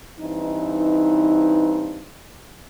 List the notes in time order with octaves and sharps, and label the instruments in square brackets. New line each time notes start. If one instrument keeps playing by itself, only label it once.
[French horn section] G2 E3 C4 D#4